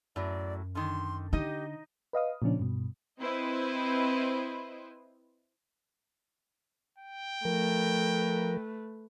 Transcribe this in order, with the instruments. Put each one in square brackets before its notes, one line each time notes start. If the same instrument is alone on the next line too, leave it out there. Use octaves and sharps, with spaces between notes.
[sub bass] F#2 [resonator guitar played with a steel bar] A2 F#3 [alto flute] D5
[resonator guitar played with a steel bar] D3 D#3 [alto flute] C6
[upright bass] D3 [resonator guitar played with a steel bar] D#4 D#5 [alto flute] G4
[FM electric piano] B4 D#5 F5 D#6
A#2 C#3 F3 C#4 D4
G2 B2
[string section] C4 E4 B4 C5 D#5
[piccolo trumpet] G5
[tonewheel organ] F3 A#4 [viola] A3 B4